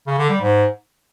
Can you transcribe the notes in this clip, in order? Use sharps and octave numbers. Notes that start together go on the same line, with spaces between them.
C#3
D3
G3
G#2